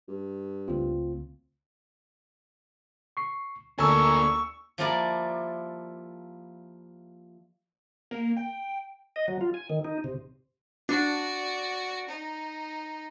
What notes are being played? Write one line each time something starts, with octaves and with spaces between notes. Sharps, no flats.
G2
C#2 A3 C4 F4
C#6 C7
D2 A#3 D4 A4 G#5 A#5 C#6 E6
F3 G3 A#3 E4 A#4 D5
A#3
G5
D#5
F#3
F4
G#5
D#3
D#4
C3
D4 F#4 D5
D#4